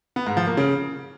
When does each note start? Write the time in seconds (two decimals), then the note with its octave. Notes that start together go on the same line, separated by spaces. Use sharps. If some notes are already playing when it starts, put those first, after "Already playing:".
0.16 B3
0.26 G#2
0.37 F3
0.47 A#3
0.57 C#3